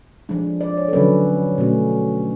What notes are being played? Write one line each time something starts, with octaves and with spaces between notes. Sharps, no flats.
F3 G#3 D4
D5
C#5
A4
D3 F#3 C#4 B4
B2 A3 C#4